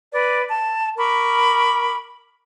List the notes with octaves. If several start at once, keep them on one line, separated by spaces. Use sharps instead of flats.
B4 D5
A5
A#4 B5 C#6 D6